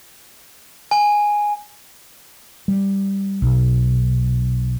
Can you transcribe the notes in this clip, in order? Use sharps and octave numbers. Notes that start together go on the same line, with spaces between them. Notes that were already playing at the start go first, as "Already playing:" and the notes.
G#5
G3
B1